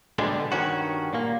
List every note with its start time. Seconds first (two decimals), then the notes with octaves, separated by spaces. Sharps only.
0.19 B2 D3 G3 G#3
0.52 G2 D#3 C#4 F#4
1.13 A#2 A#3